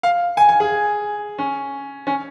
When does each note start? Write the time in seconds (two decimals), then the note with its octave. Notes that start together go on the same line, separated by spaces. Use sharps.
0.03 F5
0.37 G#5
0.49 G#5
0.60 G#4
1.38 C#4
2.07 C#4